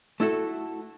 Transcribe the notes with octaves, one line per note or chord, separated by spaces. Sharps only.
A3 E4 F#4 A4